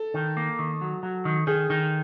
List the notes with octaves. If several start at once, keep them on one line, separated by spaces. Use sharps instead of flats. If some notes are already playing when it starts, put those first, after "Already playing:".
Already playing: A4
D#3
A#3
D#3
F#3
F#3
D#3
D#3 G#4
D#3